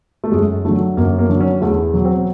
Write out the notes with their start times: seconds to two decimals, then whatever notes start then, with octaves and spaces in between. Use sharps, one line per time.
0.24 A3
0.32 F#2 G#3
0.65 D3 F#3 A3
0.97 F#2 A#3
1.19 A#3
1.29 D3 F#3
1.41 C#4
1.61 E2 A3
1.94 B2 F#3
2.05 C4